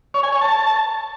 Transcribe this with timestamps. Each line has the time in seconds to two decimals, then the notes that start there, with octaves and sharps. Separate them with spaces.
0.14 C#5
0.23 G#5
0.32 C#5
0.41 A5